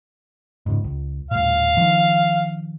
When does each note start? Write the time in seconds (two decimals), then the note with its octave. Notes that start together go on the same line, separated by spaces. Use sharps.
0.66 G#2 C#3
0.84 C#2
1.31 D#1 A2 F5
1.77 D#3 F3